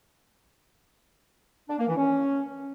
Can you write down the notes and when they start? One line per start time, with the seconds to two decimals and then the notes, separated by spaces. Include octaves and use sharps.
1.69 D4
1.79 A#3
1.88 E3
1.97 C#4